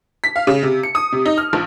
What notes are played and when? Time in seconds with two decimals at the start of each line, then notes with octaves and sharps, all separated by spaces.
0.24 B6
0.36 F5
0.47 C#3
0.63 C3
0.83 C#7
0.95 D#6
1.12 C3
1.25 D#4
1.38 F6
1.53 A#1